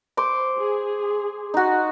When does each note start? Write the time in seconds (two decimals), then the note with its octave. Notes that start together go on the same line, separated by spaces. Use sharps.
0.17 C5 C6 D6
0.57 G#4
1.54 D#4 F#4